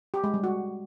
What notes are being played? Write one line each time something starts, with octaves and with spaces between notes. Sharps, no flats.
G4
G#3
G3
F#4